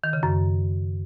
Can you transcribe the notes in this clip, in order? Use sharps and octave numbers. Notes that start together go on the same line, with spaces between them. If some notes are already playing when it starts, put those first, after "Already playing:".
D#3
C#3
F#2